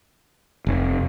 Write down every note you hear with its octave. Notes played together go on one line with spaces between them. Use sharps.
F1